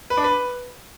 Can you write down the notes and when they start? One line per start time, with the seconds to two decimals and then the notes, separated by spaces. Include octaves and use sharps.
0.10 B4
0.17 D4
0.24 B4